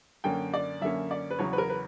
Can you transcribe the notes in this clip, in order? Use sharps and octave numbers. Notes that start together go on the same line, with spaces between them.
F#2 D3 A#3 C#4 G5
D5
F#2 D3 A#3 C#4 E5
D5
B4
E2 C#3 F#3 C#4 C#5
B4
A#4
B4